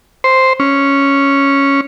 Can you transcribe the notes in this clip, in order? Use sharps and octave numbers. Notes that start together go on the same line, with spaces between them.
C5
C#4